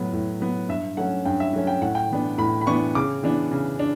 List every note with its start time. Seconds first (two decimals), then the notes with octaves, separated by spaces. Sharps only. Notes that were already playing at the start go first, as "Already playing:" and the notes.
Already playing: A2 F#3 B3
0.13 A2
0.40 F#3 B3
0.69 G2 E5
0.97 F#3 A3 C#4 F#5
1.25 G2 G5
1.40 E5
1.53 F#3 A3 C#4
1.67 G5
1.81 A2 F#5
1.95 G5
2.10 E3 B3 D4
2.38 A2 B5
2.61 B5
2.66 E3 B3 D4 C#6
2.95 C#3 D6
3.23 E3 B3 D4
3.51 C#3
3.79 D4